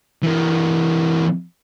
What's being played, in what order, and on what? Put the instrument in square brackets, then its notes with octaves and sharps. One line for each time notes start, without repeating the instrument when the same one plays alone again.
[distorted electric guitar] E3 A#3